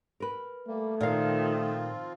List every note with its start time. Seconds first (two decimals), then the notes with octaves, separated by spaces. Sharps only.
0.20 A#4 B4
0.67 G3 A3 A#3
1.00 A#2 D#3 F3 C4 F4 A#4 F5